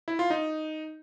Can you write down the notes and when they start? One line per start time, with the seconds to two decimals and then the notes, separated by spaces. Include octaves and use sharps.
0.08 E4
0.19 F4
0.30 D#4